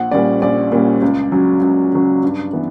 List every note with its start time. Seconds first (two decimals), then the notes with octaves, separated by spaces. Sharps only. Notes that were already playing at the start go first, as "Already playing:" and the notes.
Already playing: A#1 F#5
0.11 A#2 G3 C#4 D5
0.42 A#1 D5
0.72 A#2 G3 C#4
1.02 C#2
1.32 C#3 F#3 C#4
1.62 C#2
1.93 C#3 F#3 C#4
2.23 G2
2.53 E3 B3